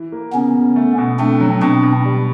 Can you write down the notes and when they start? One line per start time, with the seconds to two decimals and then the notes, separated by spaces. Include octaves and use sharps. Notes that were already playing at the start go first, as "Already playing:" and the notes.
Already playing: E3
0.12 A#3
0.33 C#3 B3 C#4
0.55 C#3
0.76 A3
0.98 B2
1.19 A3 C4 D4
1.40 F#3
1.62 B2 C4 D4
1.83 B2
2.05 G3